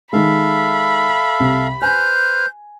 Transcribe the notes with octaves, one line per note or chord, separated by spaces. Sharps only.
D#3 G#3 A4 E5 F5 B5
C2
B4 C5 G#5 F6 G6